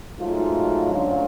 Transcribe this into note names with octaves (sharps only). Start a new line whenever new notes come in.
G#2 F#3 A3 F4
D2 D3 F#3 C#4 F4